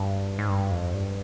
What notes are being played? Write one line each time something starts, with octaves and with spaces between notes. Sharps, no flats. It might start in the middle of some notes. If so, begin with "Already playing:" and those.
Already playing: G2
G#2
G2
F2
G2